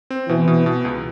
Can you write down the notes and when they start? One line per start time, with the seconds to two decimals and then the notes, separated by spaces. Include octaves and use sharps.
0.11 C4
0.28 B2 E3
0.48 B2
0.66 B2
0.85 C#2